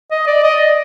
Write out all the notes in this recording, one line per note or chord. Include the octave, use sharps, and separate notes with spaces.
D#5
D5
D#5
D5